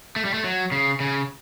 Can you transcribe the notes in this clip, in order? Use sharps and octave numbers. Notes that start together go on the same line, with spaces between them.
A3
G3
A3
F#3
C#3
C#3